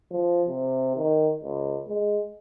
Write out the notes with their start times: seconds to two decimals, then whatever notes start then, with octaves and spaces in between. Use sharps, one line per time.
0.11 F3
0.48 C3
0.96 D#3
1.44 C#2
1.87 G#3